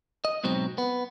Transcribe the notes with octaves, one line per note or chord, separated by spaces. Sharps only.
D#5
G#2 B2 F#3 C4
B3